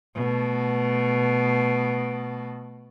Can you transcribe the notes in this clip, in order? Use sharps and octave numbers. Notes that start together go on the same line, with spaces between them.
B2 A3